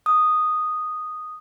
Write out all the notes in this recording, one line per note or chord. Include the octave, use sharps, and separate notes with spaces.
D#6